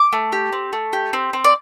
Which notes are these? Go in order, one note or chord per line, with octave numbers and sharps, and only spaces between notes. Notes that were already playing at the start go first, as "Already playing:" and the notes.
Already playing: D6
A3
G4
C4
A3
G4
C4
C4
D5